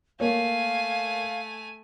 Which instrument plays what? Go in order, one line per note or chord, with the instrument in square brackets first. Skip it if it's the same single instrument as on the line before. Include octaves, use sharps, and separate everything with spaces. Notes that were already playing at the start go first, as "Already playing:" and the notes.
[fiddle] A3 G#5 [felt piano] A#3 C#5 [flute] F5